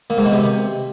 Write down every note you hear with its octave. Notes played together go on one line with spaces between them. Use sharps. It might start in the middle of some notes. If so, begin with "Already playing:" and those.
A#2
G#2
B2
C3